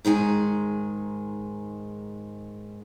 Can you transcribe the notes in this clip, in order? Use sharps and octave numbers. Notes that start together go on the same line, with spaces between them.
G#2 D#3 G#3 G#5